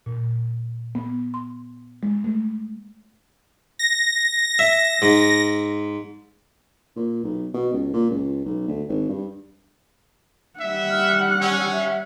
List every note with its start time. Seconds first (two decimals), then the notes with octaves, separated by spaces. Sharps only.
0.06 A#2
0.95 B3
1.34 C6
2.03 G#3
2.24 A3
3.79 A#6
4.59 E5
5.02 G#2
6.96 A#2
7.24 B1
7.54 B2
7.73 C#2
7.93 A#2
8.10 C#2
8.45 B1
8.68 D2
8.89 G#1
9.09 G2
10.60 G3 E5 F#5
10.90 F6
11.42 C#4 E6
11.72 E5